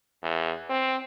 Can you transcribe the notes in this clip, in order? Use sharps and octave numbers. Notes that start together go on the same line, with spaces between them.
E2
C4